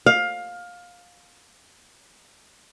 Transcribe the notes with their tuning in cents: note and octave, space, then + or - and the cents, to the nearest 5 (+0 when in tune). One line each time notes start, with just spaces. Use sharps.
F5 +20